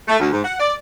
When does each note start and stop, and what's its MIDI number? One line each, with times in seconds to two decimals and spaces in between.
0.08 0.17 57
0.20 0.28 38
0.32 0.42 44
0.45 0.56 78
0.60 0.74 74